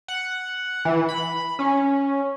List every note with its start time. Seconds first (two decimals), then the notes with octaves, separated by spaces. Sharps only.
0.08 F#5
0.85 E3
1.09 B5
1.59 C#4